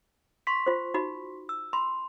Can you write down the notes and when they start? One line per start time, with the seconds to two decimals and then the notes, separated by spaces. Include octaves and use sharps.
0.47 C6 C#6 B6
0.66 F4 C5
0.94 D#4 F#4 B5
1.49 E6
1.73 B5 C6